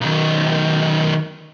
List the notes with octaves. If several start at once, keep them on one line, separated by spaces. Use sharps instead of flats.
B1 D#3